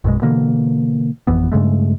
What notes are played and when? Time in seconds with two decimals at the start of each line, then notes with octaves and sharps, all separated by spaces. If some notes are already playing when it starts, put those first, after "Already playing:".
0.04 A#1 F#2 B2 G#3
0.22 B2 D3 E3 A#3
1.27 G#1 F2 E3 B3
1.52 G2 C#3 G#3 A3